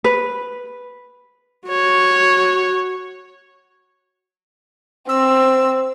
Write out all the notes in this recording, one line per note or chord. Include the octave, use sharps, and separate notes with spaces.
B4
F#4 C#5
C4 E6